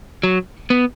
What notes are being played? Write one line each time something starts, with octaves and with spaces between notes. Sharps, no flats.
F#3
B3